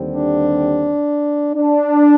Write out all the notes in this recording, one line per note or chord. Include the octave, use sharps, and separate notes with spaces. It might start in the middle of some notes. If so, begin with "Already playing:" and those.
Already playing: D#2 D3 G3 C4
D4
D4